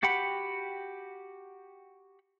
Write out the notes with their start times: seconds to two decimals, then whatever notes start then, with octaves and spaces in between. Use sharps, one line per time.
0.03 F#4 G4 F#5 G5 B5